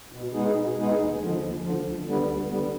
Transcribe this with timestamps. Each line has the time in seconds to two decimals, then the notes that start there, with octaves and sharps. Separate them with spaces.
0.12 B2
0.34 G#3 B3 D#4 G#4
0.56 B2
0.77 G#3 B3 D#4 G#4
0.98 D#2
1.20 D3 F3
1.41 D#2
1.62 D3 F3
1.84 D2
2.05 D3 G3 B3
2.27 D2
2.49 D3 G3 B3